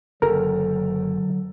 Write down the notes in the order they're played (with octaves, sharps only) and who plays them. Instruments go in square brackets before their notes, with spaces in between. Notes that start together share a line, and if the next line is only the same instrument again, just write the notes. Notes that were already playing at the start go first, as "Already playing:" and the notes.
[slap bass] F#1 [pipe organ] D3 F#3 [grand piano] A4 [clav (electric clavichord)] A#4